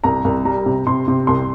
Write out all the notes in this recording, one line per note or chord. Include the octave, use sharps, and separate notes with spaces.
C2 A#5
C2
G3 A#5
C3
C3 C6
C3
C2 C6